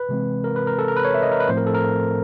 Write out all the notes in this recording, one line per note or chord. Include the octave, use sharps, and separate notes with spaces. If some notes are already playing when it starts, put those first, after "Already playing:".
Already playing: B4
C3 E3 G#3 C4
A#4
B4
A#4
A4
A#4
B4
C#5
E5
D#5
A#4
B4
A2 F3 A3 C4 C5
A#4
A4
A#4